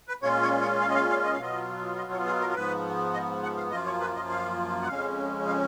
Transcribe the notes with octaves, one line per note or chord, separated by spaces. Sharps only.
B4
A#2 G#3 C#4 F4 C#5
C#5
C#5
F5
D#5
F5
F5
D#5
F5
B2 F#3 B3 F4 D#5
D#5
C#5
G#4
A#4
A#4
G#2 F3 B3 B4
D#5
F#5
F5
F#2 F3 A#3 F4 D#5
C#5
B4
D#5
F5
F#5
F2 C#3 G#3 C#4 F5
F5